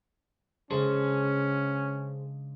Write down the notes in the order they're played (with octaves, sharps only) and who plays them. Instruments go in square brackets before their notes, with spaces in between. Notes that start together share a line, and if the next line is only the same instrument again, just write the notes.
[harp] C#3 G#3 D4 [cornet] C#4 [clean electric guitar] G#4 A4 C5